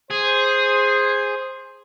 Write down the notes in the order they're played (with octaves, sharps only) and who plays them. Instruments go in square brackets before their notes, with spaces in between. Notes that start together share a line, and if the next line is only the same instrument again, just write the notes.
[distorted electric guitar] G#4 [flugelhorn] C5